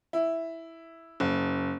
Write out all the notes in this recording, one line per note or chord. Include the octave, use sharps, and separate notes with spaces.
E4
F#1